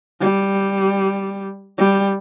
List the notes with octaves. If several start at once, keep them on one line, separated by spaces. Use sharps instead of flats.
G3
G3